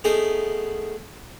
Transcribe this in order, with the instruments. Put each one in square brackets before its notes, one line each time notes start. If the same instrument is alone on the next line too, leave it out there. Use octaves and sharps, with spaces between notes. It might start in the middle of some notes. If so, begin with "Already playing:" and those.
[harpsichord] A3 B3 D#4 G#4 A#4 B4